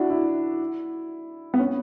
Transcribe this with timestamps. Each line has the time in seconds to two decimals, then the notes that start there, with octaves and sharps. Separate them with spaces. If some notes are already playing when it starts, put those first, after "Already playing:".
Already playing: D4 E4 F#4
0.10 E4
1.54 B3
1.59 C#4